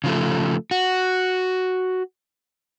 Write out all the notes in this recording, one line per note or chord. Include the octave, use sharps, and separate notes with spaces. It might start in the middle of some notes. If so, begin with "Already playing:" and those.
C#3 F3 A3
F#4